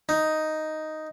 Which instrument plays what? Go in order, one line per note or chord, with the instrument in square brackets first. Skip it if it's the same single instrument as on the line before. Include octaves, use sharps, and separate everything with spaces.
[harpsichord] D#4